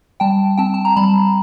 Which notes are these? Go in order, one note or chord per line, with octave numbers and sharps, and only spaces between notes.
G3 G5 A5
C4 G5 A5
A5
A#5
G3 A5 B5